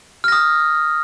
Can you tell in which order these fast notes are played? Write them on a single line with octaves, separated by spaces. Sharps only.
F6 A#6 D#6